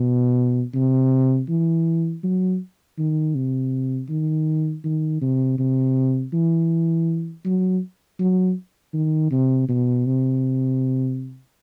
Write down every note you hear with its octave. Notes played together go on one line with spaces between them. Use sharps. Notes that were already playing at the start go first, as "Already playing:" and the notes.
Already playing: B2
C3
E3
F#3
D#3
C3
D#3
D#3
C3
C3
E3
F#3
F#3
D#3
C3
B2
C3